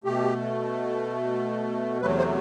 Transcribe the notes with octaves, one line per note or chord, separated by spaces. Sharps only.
B2 A3 G4
E2 C3 F#3 A3 B4
C5